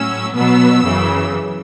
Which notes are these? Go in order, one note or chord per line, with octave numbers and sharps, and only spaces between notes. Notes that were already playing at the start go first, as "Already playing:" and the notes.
Already playing: A2 F#3 C#4 E6
B2 F#3 B3 E6
F#2 C#3 E3